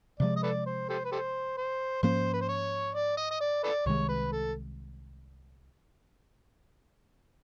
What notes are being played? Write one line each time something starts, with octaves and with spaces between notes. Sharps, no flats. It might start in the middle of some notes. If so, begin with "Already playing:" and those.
C3 F3 G#3 D5
D#5
A4 B4 D5
C5
G4 A4 C5
B4
G4 A4 C5
C5
G#2 F3 A#3 C#4 C5
B4
C5
C#5
D5
D#5
D#5
D5
A4 B4 D5
C2 C3 D#3 G#3 C#5
B4
A4